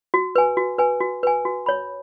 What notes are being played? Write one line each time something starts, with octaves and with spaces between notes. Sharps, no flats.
F#4
B4 G#5
F#4
B4 G#5
F#4
B4 G#5
F#4
C#5 B5